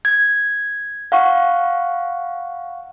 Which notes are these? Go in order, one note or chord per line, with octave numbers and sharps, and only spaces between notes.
G#6
F5 F#5 C#6